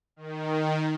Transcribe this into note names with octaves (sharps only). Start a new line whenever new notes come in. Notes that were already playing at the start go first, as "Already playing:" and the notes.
D#3